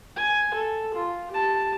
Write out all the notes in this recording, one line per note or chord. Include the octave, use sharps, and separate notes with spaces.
G#5
A4
F4
G4 A5